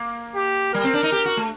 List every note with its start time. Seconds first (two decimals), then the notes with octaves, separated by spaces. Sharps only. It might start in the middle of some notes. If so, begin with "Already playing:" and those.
Already playing: A#3
0.36 G4
0.74 G3 A#4
0.84 C4
0.94 D4
1.03 D#4
1.12 G4
1.26 F#4
1.37 A3